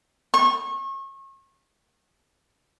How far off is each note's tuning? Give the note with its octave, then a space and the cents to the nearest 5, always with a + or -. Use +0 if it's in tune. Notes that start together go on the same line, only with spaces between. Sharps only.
C#6 -35